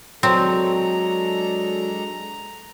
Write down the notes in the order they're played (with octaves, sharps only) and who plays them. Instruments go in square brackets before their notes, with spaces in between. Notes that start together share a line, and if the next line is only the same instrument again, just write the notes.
[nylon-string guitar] F#3 [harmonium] G#3 D4 A4 [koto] C4 [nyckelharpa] A#5